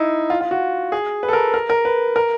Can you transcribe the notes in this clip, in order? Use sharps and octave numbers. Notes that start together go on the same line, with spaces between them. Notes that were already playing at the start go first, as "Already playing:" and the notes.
Already playing: D#4 E4
F4
F4
F#4
G#4
B4
A4
A#4
A#4
A#4
B4
A#4